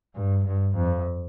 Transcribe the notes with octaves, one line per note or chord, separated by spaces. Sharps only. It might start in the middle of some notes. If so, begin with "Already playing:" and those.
G2
G2
F2